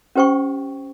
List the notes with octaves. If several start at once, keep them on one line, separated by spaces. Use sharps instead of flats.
C#4 G4 C5 G5 C#6